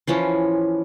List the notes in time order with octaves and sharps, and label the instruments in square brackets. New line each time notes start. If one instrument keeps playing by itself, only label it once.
[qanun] E3 F3 C#4